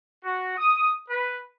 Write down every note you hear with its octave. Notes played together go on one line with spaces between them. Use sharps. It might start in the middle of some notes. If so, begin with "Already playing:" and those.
F#4
D#6
B4